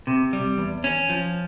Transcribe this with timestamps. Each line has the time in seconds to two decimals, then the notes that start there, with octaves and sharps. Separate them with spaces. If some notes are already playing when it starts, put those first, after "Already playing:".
0.07 C3
0.33 G3
0.58 E2
0.84 C#4
1.09 F3